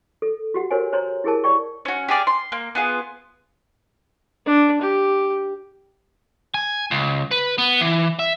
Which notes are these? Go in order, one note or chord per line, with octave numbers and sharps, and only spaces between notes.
A4
F#4 G4 F#5
F#4 A#4 C5 C#5 F#5 G#5
C5 C#5 A#5 C6
E4 G4 G#4 A#4 A5
C#5 D5 G5 C#6
C#4 F#4
G4 G#4 D5 F6
C6
A#3
B3 F4 G#4
D4
G4
G#5
C#2
B4
B3
E3
E5